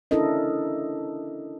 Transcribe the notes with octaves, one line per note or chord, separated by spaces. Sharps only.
C#4 D4 E4 A4 A#4 D#5